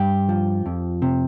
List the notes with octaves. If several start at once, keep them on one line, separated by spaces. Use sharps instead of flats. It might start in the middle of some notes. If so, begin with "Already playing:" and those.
Already playing: G2 G4
F3
F2
C3